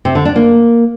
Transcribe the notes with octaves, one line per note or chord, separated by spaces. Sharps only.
C3
D3
D4
A#3